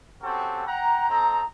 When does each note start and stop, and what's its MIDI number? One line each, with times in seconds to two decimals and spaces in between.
0.23 0.63 60
0.23 0.63 61
0.23 0.63 66
0.23 0.63 67
0.23 0.63 69
0.66 1.06 78
0.66 1.06 79
0.66 1.06 82
1.09 1.43 60
1.09 1.43 63
1.09 1.43 69
1.09 1.43 82